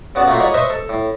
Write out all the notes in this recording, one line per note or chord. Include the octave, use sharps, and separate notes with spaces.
C#3 B3 F#4 D5 A5
A3 A#3 F4 F#4 B5
G#3 D#4 C#5 D5 B5
B4 C5 D#5 E5 B5 C#6
A4
A2